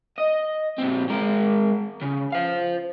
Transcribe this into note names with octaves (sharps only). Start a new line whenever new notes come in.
D#5
A#2 C4
G#3 A#4
C#3
C5 F5